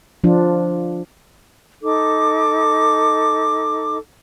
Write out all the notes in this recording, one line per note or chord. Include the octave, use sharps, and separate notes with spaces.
F3 D4 F4
D#4 A4 D6